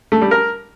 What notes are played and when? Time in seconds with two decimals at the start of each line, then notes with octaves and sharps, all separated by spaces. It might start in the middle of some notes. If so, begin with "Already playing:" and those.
0.12 A3
0.21 G3
0.31 A#4